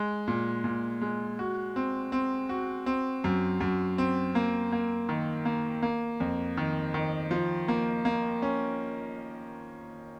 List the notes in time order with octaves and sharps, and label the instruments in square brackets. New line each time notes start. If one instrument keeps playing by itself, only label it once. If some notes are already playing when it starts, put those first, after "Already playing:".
Already playing: [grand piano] G#3
A#2
A#2
G#3
F#4
C4
C4
F#4
C4
F#2
F#2
C4
A#3
A#3
D#3
A#3
A#3
F2
D#3
D#3
F3
A#3
A#3
C#4